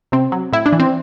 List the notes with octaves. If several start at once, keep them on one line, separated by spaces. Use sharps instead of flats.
C3 C4
F#3
A2 E4
D4
E3
C4